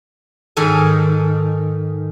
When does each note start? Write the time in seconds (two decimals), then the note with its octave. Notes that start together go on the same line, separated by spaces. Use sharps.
0.57 G#2 D#3 A4 G#5